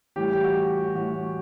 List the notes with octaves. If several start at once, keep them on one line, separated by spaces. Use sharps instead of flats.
A2 E3 G3 G4
G4
F#4
F#4
A2 E3 G3 F#4